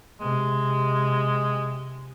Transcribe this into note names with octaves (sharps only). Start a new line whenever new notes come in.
C3 G#3